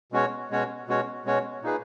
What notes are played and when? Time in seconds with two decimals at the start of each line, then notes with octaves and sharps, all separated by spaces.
0.12 B2 G#3 C#4 F#4 C#5
0.50 B2 G#3 C#4 F#4 C#5
0.87 B2 G#3 C#4 F#4 C#5
1.25 B2 G#3 C#4 F#4 C#5
1.62 A#2 A#3 D#4 G#4 B4